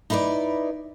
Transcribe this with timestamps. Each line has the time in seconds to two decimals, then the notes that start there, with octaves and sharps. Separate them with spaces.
0.10 D#4 E4 B4 C5 D5